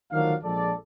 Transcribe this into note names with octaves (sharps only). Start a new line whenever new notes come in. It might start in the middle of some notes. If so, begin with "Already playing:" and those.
D2 D#3 F3 F#3 D4 F5
A#1 F3 G#3 A4 D5